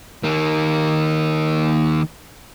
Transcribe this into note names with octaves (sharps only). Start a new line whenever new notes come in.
D#3 A#3